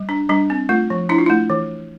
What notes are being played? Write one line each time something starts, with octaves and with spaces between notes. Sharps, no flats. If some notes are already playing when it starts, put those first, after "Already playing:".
Already playing: G3
D4
G3 D4
C4
A3 F4
F3
D4 E4
F4
A3 E4
E3